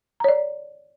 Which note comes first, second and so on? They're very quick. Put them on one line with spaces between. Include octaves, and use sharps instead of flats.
A#5 C#5 D5